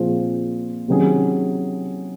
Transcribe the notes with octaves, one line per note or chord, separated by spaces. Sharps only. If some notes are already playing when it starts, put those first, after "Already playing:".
Already playing: A#2 F3 C4 F4 G#4
C3 D#3 F#3 C#4 G#4